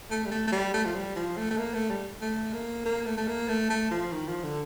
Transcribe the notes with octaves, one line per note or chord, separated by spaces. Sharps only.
A3
G3
A3
A3
G3
A3
F3
G3
F3
A3
A3
A#3
A3
G3
A3
A#3
A#3
A3
A3
A#3
A3
A3
F3
D#3
F3
D3